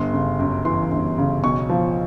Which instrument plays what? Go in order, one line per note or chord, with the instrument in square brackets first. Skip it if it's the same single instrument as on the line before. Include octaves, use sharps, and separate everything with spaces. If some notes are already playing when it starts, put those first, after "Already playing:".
Already playing: [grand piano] G1 C6
C#3
F#2
E3 C6
G1
C#3
B1 C#6
F3